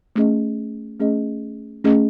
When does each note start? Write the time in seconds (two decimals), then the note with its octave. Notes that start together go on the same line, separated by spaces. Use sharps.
0.16 A3 C#4 G#4 D#5
1.00 A3 C#4 G#4 D#5
1.84 A3 C#4 G#4 D#5